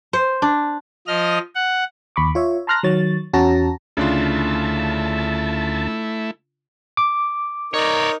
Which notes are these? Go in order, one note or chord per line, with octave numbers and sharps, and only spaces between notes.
C5
D4
F3 D#5 F6
F#5
D#2 B5 C#6 D6
F4 C#5 E5
A5 A#5 C6 F6 F#6 A#6
D#3 F#3 C#5 A6
E2 C#4 F#4 A5 A#5 A#6
D2 C#3 A3 D4 E4 F4 A5
D6
D#4 A#4 C#5 D5